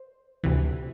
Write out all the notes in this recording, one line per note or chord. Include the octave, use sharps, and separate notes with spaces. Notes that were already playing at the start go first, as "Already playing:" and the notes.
Already playing: C5
D2 C3 E3